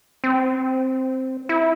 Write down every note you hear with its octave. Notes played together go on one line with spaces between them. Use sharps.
C4
E4